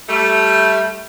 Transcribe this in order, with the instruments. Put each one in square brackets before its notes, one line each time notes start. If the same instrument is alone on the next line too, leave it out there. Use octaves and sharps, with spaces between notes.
[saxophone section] G3 A3